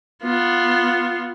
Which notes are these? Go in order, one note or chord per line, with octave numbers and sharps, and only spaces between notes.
B3 F4